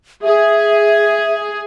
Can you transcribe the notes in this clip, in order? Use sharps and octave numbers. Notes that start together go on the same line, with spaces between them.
G#4 E5